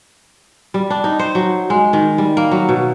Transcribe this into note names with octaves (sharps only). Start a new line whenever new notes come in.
G3
D4
D#4
C5
F#3
G#3
D#3
G3
A#3
F#3
B2